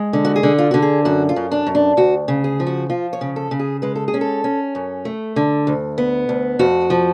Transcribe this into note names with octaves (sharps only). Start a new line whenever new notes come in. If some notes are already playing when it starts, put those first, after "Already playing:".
Already playing: G#3
D3
F#4
G#4
D3
F4
D3 F#4
G#4
F#2 F#4
F4
F#2
D4
F#2
D4
D2 F#4
C#3
G#4
F3
F#4
F3 F4
C#5
C#3
A4
C#3
G#4
G#3 B4
A4
G#4
C#4
A4
C#4
F#2
A3
D3
D2
B3
D2
F2 F#4
F3